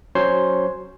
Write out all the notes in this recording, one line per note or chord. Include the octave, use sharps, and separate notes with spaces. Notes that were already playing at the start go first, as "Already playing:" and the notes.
F#3 C#4 C5 C#5 C6